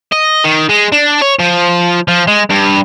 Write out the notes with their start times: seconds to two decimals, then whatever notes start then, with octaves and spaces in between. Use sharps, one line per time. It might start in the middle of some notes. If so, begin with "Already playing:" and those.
0.12 D#5
0.44 D#3
0.69 G#3
0.92 D4
1.21 C#5
1.39 F3
2.08 F3
2.27 G#3
2.50 G2